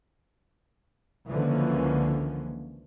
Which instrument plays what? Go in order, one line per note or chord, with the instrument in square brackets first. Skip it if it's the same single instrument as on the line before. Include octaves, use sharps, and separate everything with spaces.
[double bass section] C#2 D3 E3 F3 A#3 C#4